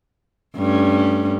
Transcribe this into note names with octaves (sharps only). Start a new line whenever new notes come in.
G2 A3 C#4